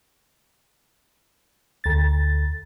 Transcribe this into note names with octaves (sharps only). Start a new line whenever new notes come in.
D2 A6